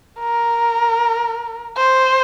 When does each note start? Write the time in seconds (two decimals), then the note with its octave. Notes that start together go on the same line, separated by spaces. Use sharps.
0.20 A#4
1.77 C5